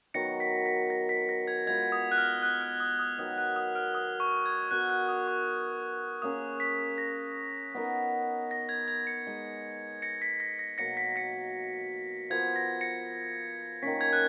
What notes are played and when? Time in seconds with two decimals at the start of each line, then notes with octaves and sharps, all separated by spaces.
0.14 D#3 F#3 B3 A#6 C#7
0.40 B6
0.66 B6
0.90 A#6
1.09 B6
1.29 A#6
1.48 G#6
1.67 G#3 B3 F4 B4 G#6
1.92 D#6
2.11 F#6
2.17 F6
2.43 F#6
2.61 F6
2.80 D#6
2.99 D#6
3.18 D#3 F#3 B3 D#6
3.38 F#6
3.56 D#6
3.75 F6
3.95 D#6
4.20 C#6
4.46 G#6
4.71 B3 F#4 A#4 D#5 F#6
4.90 F#6
5.08 D#6
5.28 C#6
6.22 A#3 C#4 G#4 D#6
6.60 B6
6.98 A#6
7.75 B3 D#4 A#4 D#5
8.51 A#6
8.69 G#6
8.88 G#6
9.07 A#6 C#7
9.27 G#3 D#4 G#4 D#5
10.02 A#6 C#7
10.22 B6
10.40 A#6
10.59 A#6
10.78 B2 F#3 A#3 A#6 C#7
10.97 B6
11.16 A#6 C#7
12.30 F3 B3 F4 A#4 G#6
12.56 A#6
12.81 A#6 C#7
13.82 D#3 A#3 C#4 B6
14.01 G#6
14.13 F#6